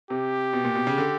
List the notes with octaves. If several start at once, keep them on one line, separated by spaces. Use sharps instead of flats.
C3 G4
B2
A#2
B2
C#3
D3